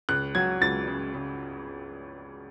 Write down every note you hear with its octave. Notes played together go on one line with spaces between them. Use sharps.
C#2 F#6
F#3 G#6
C#2 A6
C#3
C#3